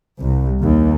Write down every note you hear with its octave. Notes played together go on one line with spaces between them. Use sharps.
C2
D#2